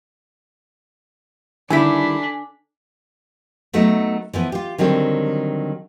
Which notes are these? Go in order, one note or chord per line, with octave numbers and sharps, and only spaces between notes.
D3 D#3 G3 D4 E4 G#5 B6
F#3 A3 B3 D#4
E3 F3 B3
F4 G4
D3 D#3 F#3 G3 C4